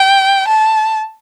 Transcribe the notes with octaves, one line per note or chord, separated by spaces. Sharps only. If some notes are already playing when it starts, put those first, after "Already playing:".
Already playing: G5
A5